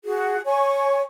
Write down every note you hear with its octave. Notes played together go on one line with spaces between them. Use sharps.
F#4 G#4
C#5 G#5 C#6